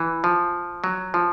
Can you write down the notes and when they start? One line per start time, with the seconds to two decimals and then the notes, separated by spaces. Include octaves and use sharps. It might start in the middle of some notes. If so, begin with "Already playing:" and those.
Already playing: E3
0.24 F3
0.84 F#3
1.14 F3